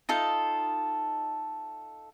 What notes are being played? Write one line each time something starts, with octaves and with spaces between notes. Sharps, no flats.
D#4 F4 A4